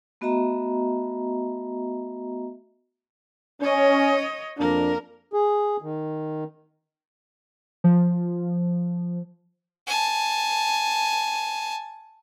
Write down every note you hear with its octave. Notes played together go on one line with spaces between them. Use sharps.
A3 B3 F#4 D#5 E5 A#5
C#4 C#5 D#5
F2 A#3 D4 A#4
G#4
D#3
F3
G#5 A5